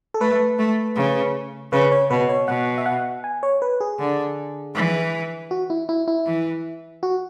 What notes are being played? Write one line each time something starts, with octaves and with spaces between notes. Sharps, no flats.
A4
A3 B4
A3
C#3
C#3 B4
C#5
B2 B4
C#5
B2 F#5
E5
F#5
G#5
C#5
B4
G#4
D3
E3
F#4
E4
E4
E4
E3
F#4